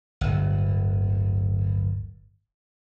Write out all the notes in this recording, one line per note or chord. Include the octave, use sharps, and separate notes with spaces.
D1 G1